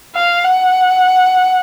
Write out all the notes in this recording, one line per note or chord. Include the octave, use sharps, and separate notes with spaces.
F5
F#5